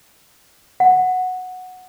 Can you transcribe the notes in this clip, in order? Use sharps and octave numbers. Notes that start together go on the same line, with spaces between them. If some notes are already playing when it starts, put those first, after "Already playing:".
F#5